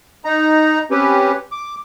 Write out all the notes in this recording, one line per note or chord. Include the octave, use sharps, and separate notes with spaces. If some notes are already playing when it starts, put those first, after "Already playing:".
D#4 A#5
C4 C#4 G4 B4
D6